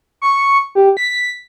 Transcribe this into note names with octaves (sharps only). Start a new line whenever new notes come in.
C#6
G4
B6